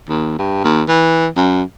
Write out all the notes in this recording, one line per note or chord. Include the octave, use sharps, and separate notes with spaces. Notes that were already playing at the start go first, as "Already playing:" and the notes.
D#2
G2
D#2
E3
F#2